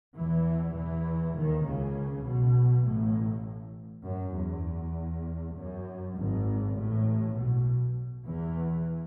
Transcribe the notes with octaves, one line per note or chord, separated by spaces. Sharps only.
E2 E3
E2 E3
D#2 D#3
C#2 C#3
B1 B2
A1 A2
F#2
E2
F#2
G#1 G#2
A1 A2
B1 B2
E2 E3